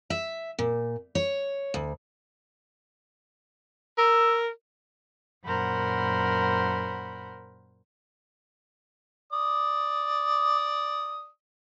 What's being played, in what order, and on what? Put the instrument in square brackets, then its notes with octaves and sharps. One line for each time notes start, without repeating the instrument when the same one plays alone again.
[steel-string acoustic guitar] E5
A#2
C#5
D2
[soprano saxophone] A#4 [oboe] E6
[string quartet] F#2 A#2 A#4 C5 F#5 B5
[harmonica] D5 D#6